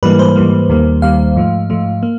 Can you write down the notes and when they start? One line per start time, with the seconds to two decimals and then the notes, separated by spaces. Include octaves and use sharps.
0.03 G#2 E3 G3 A#3 B4
0.19 C5
0.36 G#2 E3 G3 A#3
0.69 D#2 D#3 G3 A#3
1.02 D#2 D#3 G3 A#3 F5
1.36 G#2 F3 A3
1.70 G#2 F3 A3
2.03 A#3